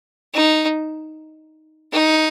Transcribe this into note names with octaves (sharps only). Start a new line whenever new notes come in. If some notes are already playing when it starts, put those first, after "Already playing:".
D#4
D#4